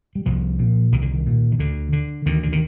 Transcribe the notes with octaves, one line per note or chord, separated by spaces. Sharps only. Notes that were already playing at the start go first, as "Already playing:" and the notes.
G3
C2 F3
A#2
C2 D#3
D3
D#3
A#2
D#3
D2 D3
D3
D2 D#3
D3
D#3